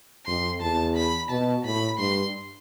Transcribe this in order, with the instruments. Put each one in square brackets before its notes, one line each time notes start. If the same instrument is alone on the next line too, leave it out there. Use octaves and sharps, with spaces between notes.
[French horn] F2 [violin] C6
[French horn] E2 [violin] A5
[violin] B5
[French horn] B2 [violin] A5
[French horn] A2 [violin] B5
[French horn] G2 [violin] C6